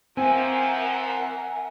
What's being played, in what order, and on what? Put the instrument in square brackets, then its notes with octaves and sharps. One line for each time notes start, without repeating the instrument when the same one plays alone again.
[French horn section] E3 F3 [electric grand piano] C4 [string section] A#4 E5 F#5 [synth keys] G#5